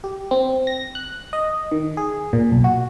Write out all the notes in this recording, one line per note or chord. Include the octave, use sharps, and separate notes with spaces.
G4
C4
A#6
F#6
D#5
D#3
G#4
A#2
B1
F#4